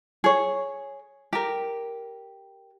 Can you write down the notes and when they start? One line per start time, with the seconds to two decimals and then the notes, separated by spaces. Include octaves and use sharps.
0.24 G#4 C#5
1.33 G4 A#4